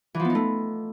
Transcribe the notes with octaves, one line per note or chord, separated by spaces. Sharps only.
E3
F3
B3
D#4
A3